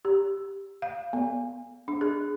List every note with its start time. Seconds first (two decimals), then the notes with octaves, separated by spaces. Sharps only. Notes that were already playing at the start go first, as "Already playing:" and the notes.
0.05 G4
0.82 F5
1.13 B3
1.88 D4
2.01 G#4